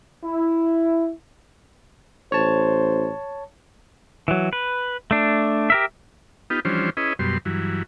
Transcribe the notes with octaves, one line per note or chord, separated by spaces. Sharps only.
E4
A1 C5 C#5 A5
E3 F#3
B4
A3 D4
G4 A#4 E5
B3 D#4 F4 G4
E3 F3 G3 C#4 D4 C5
C#4 E4 G#4 B4 D#5
F#2 B2 G3 C6
G2 E3 F#3